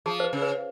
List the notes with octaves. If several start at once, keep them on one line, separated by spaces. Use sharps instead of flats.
F3 G#4
C5
B4
C#3
B4